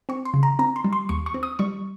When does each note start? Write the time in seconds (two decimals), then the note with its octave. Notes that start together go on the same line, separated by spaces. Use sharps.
0.09 C4 C#6
0.25 C6
0.34 C#3
0.43 A#5
0.59 C4 A#5
0.76 C6
0.84 G3
0.93 C6
1.09 D#2 C#6
1.26 C#6
1.34 C4
1.43 D#6
1.59 G3 C#6